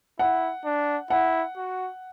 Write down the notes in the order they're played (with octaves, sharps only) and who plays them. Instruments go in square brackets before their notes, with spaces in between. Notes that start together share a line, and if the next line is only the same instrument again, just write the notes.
[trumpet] E4 [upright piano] F#5
[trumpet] D4
[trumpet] E4 [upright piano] F#5
[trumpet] F#4